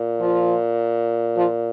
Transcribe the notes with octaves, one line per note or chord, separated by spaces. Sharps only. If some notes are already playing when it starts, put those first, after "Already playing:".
Already playing: A#2
F3 F4
F3 F4